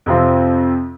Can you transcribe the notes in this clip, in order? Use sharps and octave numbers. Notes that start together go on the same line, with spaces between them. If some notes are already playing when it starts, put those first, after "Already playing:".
F2 C3 F3 C4